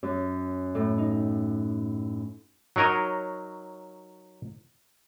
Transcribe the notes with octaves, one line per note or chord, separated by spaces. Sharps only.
F#2
A2
D#4
F#3 D#4 A#4 C#5 D#5